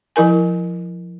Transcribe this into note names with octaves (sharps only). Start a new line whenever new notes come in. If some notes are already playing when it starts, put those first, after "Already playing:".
F3 E4 A#4 G#5